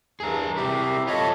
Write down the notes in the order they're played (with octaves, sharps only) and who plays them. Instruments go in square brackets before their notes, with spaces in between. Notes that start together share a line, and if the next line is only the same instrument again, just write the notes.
[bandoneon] E2 G2 [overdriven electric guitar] G#4 A#4
[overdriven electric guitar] C3 E4 [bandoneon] G4
[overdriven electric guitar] F4 A4 [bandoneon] C#5 D#5 B5